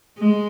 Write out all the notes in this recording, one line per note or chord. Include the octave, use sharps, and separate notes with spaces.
G#3